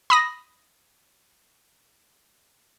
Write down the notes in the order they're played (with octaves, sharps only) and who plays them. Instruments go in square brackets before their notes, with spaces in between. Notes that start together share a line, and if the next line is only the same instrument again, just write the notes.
[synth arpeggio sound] B5 D#6 A#6